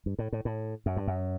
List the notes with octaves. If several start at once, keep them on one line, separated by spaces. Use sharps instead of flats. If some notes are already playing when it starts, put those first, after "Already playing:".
G2
A2
A2
A2
F#2
G2
F#2